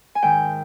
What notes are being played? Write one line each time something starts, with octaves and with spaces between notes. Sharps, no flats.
G#5
G#2 D#3 G5